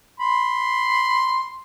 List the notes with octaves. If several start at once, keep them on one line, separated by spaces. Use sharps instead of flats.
B5 C6